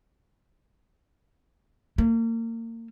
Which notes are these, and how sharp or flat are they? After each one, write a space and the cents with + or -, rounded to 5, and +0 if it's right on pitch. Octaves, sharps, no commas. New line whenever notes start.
A#3 -35